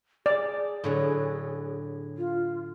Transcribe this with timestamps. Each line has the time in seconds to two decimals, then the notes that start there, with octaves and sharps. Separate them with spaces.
0.26 G#4 D5
0.84 A2 D3 F#3
2.18 F4